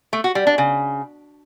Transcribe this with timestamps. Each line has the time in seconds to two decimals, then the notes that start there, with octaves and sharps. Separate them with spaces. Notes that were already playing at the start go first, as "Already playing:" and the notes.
0.13 A3
0.24 F#4
0.35 G3
0.47 D4
0.58 C#3